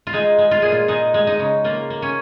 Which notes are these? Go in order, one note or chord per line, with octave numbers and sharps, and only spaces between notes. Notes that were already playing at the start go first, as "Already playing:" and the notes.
F4
G#3 D#4
G#3
F4
A#2 G#4
F4
G#3 D#4
G#3
D#4
C#3
A#3 F4
A#3
C#4